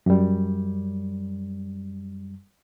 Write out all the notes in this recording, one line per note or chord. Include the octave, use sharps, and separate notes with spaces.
F#2 G3